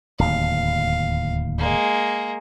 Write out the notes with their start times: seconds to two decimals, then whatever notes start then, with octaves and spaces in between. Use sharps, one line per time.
0.19 D1 D#2 F5
1.58 G#3 A#3